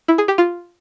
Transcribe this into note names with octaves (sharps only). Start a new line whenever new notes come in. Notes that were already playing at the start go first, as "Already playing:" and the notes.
E4
G#4
G4
F4